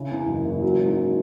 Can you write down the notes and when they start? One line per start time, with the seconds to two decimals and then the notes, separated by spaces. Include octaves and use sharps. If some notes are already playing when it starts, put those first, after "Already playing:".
Already playing: C#3 E4
0.11 E2
0.28 F#1
0.45 F#1
0.62 F#3
0.80 G#2